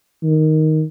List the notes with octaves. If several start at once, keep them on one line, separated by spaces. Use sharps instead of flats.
D#3